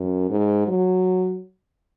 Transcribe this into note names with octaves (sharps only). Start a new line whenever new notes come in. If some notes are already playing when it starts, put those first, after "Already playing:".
Already playing: F#2
G#2
F#3